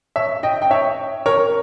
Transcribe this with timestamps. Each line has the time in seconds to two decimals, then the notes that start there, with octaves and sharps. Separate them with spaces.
0.16 C#5 E5
0.43 D#5 G5
0.62 G5
0.71 C#5 E5
1.26 A#4 C#5